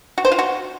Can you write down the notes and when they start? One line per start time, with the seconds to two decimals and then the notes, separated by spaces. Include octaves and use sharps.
0.18 F#4
0.25 C5
0.32 F4
0.39 F#4